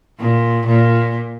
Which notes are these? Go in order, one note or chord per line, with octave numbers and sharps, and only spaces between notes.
A#2
A#2